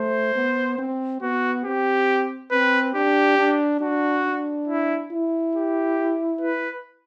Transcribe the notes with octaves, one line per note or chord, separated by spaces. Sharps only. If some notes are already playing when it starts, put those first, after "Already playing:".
Already playing: A3 C5
B3
C4
B3 F#4
C4 G4
C4 B4
D4 G4
D4
D4 F#4
D4
E4
E4
G4
B4